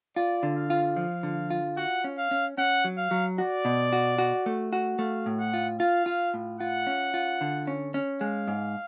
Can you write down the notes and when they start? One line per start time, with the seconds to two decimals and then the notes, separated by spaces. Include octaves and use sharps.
0.16 F4 D5
0.43 D3
0.56 F5
0.70 F4
0.96 F3 F5
1.23 D3
1.50 F4
1.77 F#4 F#5
2.04 C#4
2.18 F5
2.31 C#4
2.58 C#4 F#5
2.84 F#3
2.98 F5
3.11 F#3
3.38 F#4 D5
3.65 B2
3.93 F#4
4.18 F#4
4.46 A3
4.73 F#4
4.99 A3 F5
5.26 A2
5.39 F#5
5.53 F4
5.80 F4 F5
6.06 F4
6.34 A2
6.60 F4 F#5
6.87 C#4
7.14 F4
7.41 D3
7.67 C#4
7.94 C#4
8.21 G#3 F5
8.48 G#2